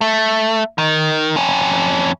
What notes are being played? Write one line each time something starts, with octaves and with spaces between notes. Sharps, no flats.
A3
D#3
F2 C#4